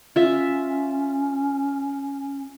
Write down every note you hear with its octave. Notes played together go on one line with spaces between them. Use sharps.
C#4 F4 E5